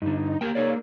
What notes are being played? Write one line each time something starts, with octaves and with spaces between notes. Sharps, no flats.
G2 D3 D#4
A#3 G4 A#4 G5
D#4 G#4 C#5 D5